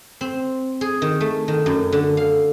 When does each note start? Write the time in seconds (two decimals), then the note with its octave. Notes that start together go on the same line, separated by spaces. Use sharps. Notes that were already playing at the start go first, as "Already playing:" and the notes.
0.21 C4
0.81 G#4
1.02 D#3
1.20 A3
1.48 D#3
1.66 F#2
1.92 D3
2.17 F5